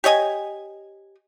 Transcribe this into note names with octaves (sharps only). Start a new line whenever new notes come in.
G4 C#5 D#5 G#5